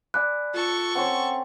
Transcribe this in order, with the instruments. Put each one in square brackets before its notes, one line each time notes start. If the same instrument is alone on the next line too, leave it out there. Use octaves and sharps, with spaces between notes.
[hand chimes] D5 G#5 B5 [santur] D6 [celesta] F#6
[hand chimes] F4 [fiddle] A4 C#6
[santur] C4 C#4 C#5 [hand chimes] F#5 C6